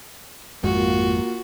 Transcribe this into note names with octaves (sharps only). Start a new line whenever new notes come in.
G#1 F2 G#3 A#3 F4 F#4